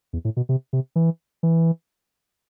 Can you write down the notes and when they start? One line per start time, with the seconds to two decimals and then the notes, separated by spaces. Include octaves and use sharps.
0.13 E2
0.25 A2
0.37 B2
0.49 C3
0.73 C3
0.96 E3
1.43 E3